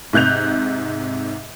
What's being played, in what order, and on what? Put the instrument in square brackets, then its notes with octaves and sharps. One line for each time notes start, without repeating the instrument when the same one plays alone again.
[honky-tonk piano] G#2 C3 F#6 G6 F7